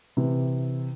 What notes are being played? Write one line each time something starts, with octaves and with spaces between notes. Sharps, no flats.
C3 E3